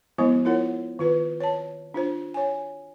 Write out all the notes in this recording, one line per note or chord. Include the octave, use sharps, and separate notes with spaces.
F3 G#3 B3 E4 D#5
E4 F4 A#4 C#5 F#5
D#3 F4 B4
C#5 A5
D4 F4 C5
C#5 G#5